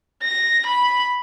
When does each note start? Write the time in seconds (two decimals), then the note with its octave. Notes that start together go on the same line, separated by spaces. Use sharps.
0.23 A#6
0.66 B5